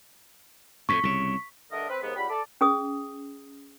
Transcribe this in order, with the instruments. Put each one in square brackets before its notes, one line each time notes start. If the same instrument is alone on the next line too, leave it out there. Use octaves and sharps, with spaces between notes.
[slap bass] F2 A2 [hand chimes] C#6 B6
[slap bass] C2 C#3
[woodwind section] G2 D3 A3 D4 A#4 D#5
C4 B4
D#2 G#2 B3
C#2 G3 G4 F#5 B5
A4 D5
[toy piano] C#4 G#4 D#6